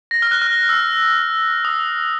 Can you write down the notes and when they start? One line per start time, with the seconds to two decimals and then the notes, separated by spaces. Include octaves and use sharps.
0.11 A#6
0.22 F6
0.31 F#6
0.42 F6
0.69 E6
1.65 D#6